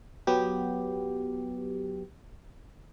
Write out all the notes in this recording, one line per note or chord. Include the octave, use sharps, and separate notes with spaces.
F#3 B3 G4